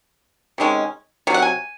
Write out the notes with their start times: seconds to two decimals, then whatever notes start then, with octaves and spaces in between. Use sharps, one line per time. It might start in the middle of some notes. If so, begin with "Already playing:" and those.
0.58 C3 D#3 G#3 C#4
1.27 C3 F#3
1.34 F#5
1.42 G#5